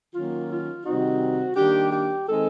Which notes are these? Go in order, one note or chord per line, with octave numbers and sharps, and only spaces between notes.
D#3 F#3 A#3 C#4 F4
F4
C3 D#3 G3 C4 D#4 F#4
D#3 G3 A#3 D4 G4
G4
D#3 G#3 C4 D#4 A4